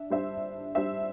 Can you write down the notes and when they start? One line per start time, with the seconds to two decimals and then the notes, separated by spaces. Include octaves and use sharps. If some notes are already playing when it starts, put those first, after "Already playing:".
Already playing: D4 E5
0.10 G3 D4 C5 E5
0.75 G3 D4 C5 E5